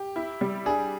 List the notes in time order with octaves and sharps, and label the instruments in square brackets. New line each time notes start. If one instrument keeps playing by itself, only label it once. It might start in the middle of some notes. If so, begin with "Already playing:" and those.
Already playing: [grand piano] G4
[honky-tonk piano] E4
G3
[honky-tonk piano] D4 [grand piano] G#4